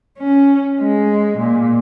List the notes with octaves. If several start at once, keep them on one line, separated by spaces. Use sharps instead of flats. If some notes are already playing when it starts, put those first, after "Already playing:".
C#4
G#3
A#2